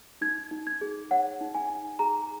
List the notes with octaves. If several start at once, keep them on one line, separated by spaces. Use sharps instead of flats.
D#4 G#6
D#4
G#6
G#4
C#5 F#5
D#4
G#5
D#4
G#4 A#5